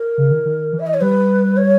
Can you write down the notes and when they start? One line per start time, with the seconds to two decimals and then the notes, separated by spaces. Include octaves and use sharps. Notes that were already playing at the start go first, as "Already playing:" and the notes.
Already playing: A#4
0.18 C#3
0.31 D#3
0.45 D#3
0.73 E3
0.79 E5
0.87 D#5
0.94 C#5
1.01 G3 B4
1.57 C#5